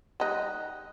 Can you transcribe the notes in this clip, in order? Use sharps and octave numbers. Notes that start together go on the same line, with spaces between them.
G3 D#4 F#5 F#6